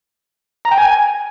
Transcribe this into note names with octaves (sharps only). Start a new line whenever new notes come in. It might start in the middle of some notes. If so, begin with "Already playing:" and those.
A#5
G5
G#5